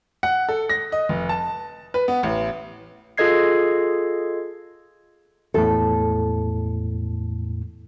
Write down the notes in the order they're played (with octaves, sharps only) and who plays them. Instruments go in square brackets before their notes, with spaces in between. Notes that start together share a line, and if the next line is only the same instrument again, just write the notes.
[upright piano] F#5
A4
A#6
D#5
F1
A5
B4
B3
A1
[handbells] F4 G#4 A4 D#5 G#6 C7
[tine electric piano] E2 A2 [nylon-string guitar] A4